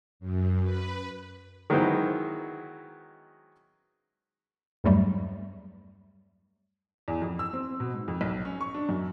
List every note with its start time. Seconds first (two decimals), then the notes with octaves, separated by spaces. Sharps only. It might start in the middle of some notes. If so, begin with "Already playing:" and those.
0.20 F#2
0.63 B4
1.70 D#3 F#3 G#3 B3 E4 C5
4.84 E2 G2 F#3 G3 A3
7.08 E2
7.22 F2
7.39 E6
7.53 C4
7.80 B2
7.94 G#2
8.08 F2
8.21 B1
8.45 C#4
8.61 C#6
8.74 D4
8.89 F#2